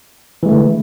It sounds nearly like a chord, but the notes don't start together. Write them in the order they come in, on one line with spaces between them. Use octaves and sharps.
E3 G#3 A3 D3